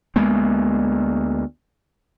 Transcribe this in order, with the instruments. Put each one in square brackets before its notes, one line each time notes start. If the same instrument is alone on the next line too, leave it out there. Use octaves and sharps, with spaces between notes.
[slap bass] D2 G#3 A#3 B3